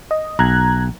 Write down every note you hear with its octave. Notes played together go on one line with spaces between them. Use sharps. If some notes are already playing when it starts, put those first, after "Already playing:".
D#5
B1 A#5 F#6 G#6